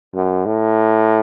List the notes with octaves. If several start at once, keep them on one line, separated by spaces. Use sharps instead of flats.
F#2
A2